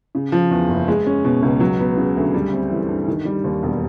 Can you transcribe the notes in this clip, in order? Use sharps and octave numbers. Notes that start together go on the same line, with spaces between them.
C#3
F3
E2
F#1
G#3
C#4
B2
C#2
F#3
B3
C#3
D2
G3
C4
E3
G2
D#3
G3
D#2
E1